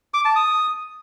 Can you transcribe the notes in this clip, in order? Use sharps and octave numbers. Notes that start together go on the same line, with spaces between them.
D6
A5
D#6